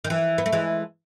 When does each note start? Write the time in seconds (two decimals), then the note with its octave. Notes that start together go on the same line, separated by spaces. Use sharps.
0.04 D#3
0.10 E3
0.38 B3
0.46 A3
0.53 E3 G#3